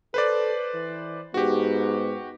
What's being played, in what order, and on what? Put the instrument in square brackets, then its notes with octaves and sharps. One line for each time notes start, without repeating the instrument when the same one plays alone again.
[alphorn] A4 [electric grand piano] B4 C5 D5
[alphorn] E3
[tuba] G#2 [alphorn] B3 [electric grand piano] F#4 G4